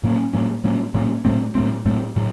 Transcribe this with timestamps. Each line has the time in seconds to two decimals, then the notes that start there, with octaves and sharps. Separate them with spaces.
0.03 A2 F#3 A#3 C#4
0.33 A2 F#3 A#3 C#4
0.64 A2 F#3 A#3 C#4
0.94 A2 F#3 A#3 C#4
1.25 A2 F#3 A3 C4
1.55 A2 F#3 A3 C4
1.86 A2 F#3 A3 C4
2.16 A2 F#3